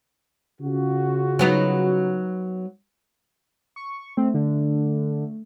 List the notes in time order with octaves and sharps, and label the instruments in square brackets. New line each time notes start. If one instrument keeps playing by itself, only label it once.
[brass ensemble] C#3 F4 F#4
[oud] F#3 B3 D#4
[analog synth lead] C#6
[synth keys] A3 [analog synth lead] C4
[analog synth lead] D3